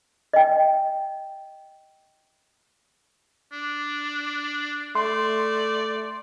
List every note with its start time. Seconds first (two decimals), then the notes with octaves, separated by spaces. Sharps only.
0.34 D#5 G5
3.52 D4
4.95 A3 D5 C6